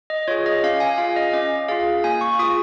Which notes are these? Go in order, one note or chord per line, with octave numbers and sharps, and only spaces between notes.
D#5
F4 G#4 C#5
D#5
C#4 F5
G#5
F4 G#4 F5
D#5
C#4 D#5
F4 G#4 F5
A#3 G#5
C#6
F4 G#4 D#6